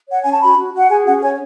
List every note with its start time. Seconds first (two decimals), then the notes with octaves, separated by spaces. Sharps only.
0.10 C#5 F#5
0.22 C#4 G#5
0.31 A5
0.42 F#4 B5
0.58 F#4
0.74 F#4
0.79 F#5
0.90 G#4 G#5
1.07 C#4 F#5
1.23 C#5 G#5